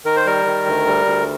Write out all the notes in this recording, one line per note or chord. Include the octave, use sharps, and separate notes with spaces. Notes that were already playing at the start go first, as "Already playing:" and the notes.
D#3 A#4
C5
G3 A#4
D#3
D2
G3
D2